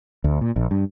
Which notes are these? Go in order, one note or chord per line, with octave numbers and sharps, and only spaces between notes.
D2
A#2
A#1
G2